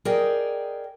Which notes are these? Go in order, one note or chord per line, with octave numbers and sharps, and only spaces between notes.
G#4 A#4 D5 D#5 G5